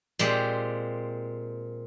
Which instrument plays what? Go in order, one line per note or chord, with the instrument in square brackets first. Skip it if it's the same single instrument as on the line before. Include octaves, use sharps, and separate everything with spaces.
[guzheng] A#2 G#3 C4 G4